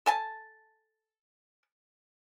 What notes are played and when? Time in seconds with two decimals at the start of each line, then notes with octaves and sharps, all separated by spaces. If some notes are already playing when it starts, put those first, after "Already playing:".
0.06 A4 G#5 A5